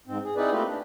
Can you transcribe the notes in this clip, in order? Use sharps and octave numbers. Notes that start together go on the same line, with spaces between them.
G#2 C4
G#4
C4 D#4 E4 G#4 B4 D5
A3 A#3 C4 F4 G4 B4
D4